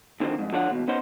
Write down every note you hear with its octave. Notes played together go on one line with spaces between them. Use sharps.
D#2 D3 D#3 F3 C4
F2 G#2
D3 F3 D4 F4 C#5 F#5
D#2 B2
B3 C#4 D#4 C5